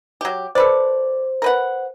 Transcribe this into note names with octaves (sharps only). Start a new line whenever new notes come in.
F#3 G4
A4 B4 C5 D5
A#4 B4 F#5